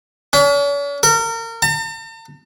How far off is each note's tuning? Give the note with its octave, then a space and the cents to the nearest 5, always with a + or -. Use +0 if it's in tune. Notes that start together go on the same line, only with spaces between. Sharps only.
C#4 +45
A#4 -30
A5 +45